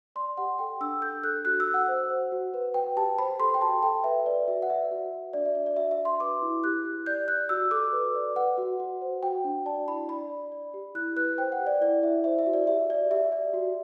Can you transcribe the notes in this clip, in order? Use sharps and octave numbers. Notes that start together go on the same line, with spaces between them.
D5 C6
G4 F#5
A4 G5
D4 E6
A4 G6
A4 F#6
F#4 F#6
E6
F#4
F#5
C5
C5
F#4
B4
B4 G5
G4 A5
C5 B5
A4 C6
G5
F#4 A5
A4 G5
B4 E5
B4 D5
F#4 E5
F#5
D5 E5
F#4
F#4
D4 D5
E5
D4 D5
D5
F#4 E5
E5
F#4
C6
B4 D6
E4
G4 F#6
G4
D5 G6
D5 F#6
F#4 E6
A4 D6
B4
D5
B4 F#5
F#4
F#4
C5
F#4 G5
D4
D5 A5
E4 B5
D5 B5
D5
D5
G4
E4 F#6
B4 F#6
C5 G5
F#5
G4
D5
E4 D5
E4 E5
C5 E5
E5
F#4
D5
G4 E5
D5
G4 E5
D5
F#4